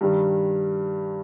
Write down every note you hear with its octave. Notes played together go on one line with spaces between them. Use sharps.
G2 D#3 G3